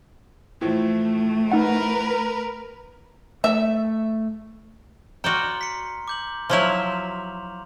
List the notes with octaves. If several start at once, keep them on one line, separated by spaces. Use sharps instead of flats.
A2 E3 F3 A3
D#4 A#4 B4 F#5
A3 E5
F#4 D5 G5 A#5 C6 F6
B6 C#7
D6 G6 F#7
F3 F#3 E4 C6 F6 F7